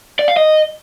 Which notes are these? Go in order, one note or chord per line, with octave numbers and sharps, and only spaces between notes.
D5
F5
D#5